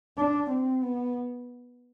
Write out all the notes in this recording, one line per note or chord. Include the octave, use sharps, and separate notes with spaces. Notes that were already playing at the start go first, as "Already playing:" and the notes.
D4
C4
B3